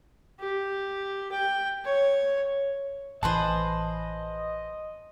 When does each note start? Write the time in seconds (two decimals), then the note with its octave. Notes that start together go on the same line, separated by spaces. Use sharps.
0.40 G4
1.31 G5
1.85 C#5
3.23 A1 E3 G#4 B4 C5 D#5 A5